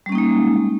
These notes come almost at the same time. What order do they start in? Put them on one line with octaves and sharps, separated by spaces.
G3 C#4 A#3 D#4 G#3